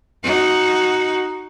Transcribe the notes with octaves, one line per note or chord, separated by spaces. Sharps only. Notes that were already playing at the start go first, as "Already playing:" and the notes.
D#4 F#4